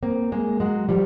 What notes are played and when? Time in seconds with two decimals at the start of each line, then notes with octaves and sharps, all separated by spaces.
0.03 A#3 C4
0.32 G#3 A#3
0.60 F#3 G#3
0.89 F3 G3